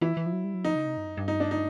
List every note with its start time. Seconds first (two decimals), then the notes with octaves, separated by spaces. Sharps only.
0.01 E3 E4
0.17 E3
0.26 F3
0.33 F#3
0.44 G3
0.54 F#3
0.64 F3 D#4
0.75 C#3
0.86 C3
0.97 G2
1.06 F#2
1.17 G2
1.28 D#4
1.40 D4
1.51 D#4